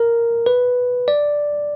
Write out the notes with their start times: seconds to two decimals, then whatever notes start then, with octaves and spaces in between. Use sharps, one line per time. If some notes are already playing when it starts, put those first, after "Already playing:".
Already playing: A#4
0.46 B4
1.08 D5